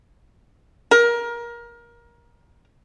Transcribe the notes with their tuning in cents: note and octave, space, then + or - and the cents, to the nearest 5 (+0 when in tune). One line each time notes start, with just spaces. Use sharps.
A#4 +20